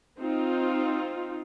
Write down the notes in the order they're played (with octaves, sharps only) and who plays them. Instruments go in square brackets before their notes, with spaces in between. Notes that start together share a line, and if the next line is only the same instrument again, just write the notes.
[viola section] C4 D#4 F4